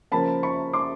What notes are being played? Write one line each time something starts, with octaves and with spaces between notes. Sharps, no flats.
C#3 F3 A#3 A5 B5
B5 C#6
C6 D6